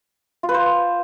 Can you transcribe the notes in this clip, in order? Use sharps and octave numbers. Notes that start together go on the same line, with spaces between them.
F4
B4
C5